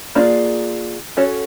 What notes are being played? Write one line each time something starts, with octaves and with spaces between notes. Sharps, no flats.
A#3 D4 F4 G#4
C#4 F#4 A4 C#5